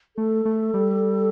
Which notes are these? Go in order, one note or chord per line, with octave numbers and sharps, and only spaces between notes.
A3 A4
A3
G3